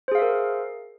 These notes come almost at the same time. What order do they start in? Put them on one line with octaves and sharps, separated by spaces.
C5 G#4 F5 E5 A#4